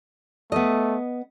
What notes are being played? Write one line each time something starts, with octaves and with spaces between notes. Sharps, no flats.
A3 B3 D#5